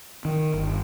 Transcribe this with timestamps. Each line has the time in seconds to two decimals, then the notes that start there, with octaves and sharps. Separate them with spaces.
0.25 D#3
0.54 G1